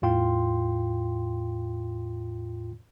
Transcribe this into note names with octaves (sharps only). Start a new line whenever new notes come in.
E2 A2 F4 G5 C6